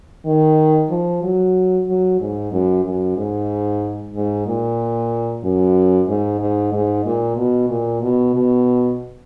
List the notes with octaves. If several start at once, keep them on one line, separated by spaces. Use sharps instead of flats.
D#3
F3
F#3
F#3
G#2
F#2
F#2
G#2
G#2
A#2
F#2
G#2
G#2
G#2
A#2
B2
A#2
B2
B2